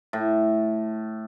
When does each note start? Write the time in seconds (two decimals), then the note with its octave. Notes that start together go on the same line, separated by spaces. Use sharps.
0.13 A2